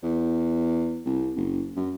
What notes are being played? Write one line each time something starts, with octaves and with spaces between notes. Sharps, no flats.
E2
C2
F#1
F#2